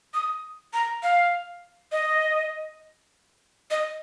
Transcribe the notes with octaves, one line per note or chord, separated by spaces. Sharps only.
D#6
A#5
F5
D#5
D#5